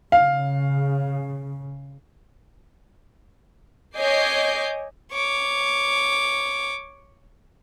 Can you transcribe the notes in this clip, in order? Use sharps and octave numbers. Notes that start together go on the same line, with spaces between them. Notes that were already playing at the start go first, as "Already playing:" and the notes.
C#3 F5
C#5 D#5 G#5 D6 G6 C7
C#5 D6